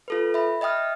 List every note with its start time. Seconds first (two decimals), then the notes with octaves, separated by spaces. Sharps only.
0.08 F4 A4 B4
0.34 E5 B5
0.61 D#5 E5 G5 D#6 F6